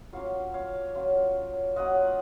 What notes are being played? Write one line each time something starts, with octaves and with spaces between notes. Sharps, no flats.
F#3 A#3 C#4 F4 C#5 F5
C#5 F5
F#3 A#3 C#4 F4
F#3 A#3 C#4 F4 D#5 F#5